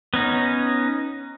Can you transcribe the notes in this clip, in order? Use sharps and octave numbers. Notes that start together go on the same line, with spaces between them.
B3 C#4 D#4